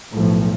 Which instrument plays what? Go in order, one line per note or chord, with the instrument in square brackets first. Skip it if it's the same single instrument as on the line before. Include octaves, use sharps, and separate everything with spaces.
[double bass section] B1 A2 F3